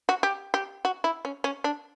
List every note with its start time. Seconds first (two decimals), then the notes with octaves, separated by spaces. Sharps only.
0.09 F#4
0.23 G4
0.54 G4
0.85 F#4
1.04 E4
1.25 C#4
1.44 C#4
1.64 D4